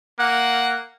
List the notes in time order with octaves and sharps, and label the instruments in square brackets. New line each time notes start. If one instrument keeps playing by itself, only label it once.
[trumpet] A#3 [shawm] F#5